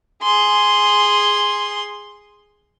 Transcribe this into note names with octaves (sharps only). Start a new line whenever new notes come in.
G#4 C6